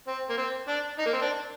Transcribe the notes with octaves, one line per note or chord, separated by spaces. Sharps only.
C4
A#3
C4
D4
D#4
A#3
C4
D4